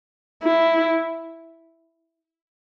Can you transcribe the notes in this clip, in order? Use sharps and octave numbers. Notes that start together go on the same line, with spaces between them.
E4